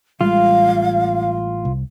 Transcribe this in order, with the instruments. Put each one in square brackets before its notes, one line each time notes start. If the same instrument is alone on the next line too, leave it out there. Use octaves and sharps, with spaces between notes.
[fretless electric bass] A1 G3 G#3 [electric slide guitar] F4 [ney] F5
[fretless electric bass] C2